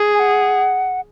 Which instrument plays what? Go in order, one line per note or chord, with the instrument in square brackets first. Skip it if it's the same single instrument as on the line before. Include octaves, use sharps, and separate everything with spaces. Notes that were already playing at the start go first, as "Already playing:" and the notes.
Already playing: [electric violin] G#4
[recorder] G#5
F#5